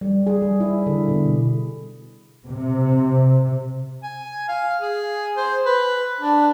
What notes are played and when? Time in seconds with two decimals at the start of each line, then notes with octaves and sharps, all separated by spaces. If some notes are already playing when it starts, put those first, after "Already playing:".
0.01 G3
0.27 G#4
0.42 G3
0.60 E4
0.87 D3
1.08 B2
2.47 C3
4.03 G#5
4.48 F5
4.80 G#4
5.37 C5
5.66 B4
6.20 D4